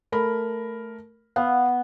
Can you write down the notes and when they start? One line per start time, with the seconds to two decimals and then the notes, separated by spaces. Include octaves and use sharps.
0.12 A3 A#4 B5
1.36 B3 F5